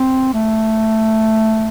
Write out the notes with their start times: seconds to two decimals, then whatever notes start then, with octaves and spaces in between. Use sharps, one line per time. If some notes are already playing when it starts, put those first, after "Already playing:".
Already playing: C4
0.34 A3